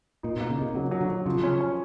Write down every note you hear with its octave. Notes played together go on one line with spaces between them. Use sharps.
A#2 D#4
B2
A#3
C#3
C3 D#4
C#3 F#3
F#3
D3
F#3
C#3 F3
C3
C#3 C#4
C#4